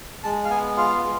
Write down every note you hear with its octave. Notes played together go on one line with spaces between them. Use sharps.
G#3 A5
F5
B3 G#5
F4 F5
G#3